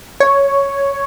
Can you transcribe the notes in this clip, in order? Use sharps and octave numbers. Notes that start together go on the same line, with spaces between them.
C#5